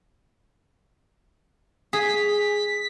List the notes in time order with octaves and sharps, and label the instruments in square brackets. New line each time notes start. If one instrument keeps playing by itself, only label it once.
[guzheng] G#4 [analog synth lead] B6